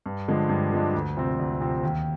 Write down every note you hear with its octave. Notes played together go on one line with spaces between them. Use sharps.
G2
D3 F3 G#3 D4
G2
D3 F3 G#3 D4
D2
C3 F3 C4
D2
C3 F3 C4
D#2